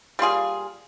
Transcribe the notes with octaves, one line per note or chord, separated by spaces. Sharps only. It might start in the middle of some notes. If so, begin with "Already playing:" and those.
G3 A#3 F4 G#4